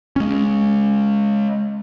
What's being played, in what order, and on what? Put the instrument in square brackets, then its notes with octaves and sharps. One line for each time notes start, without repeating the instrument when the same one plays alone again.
[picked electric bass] G#3 C#4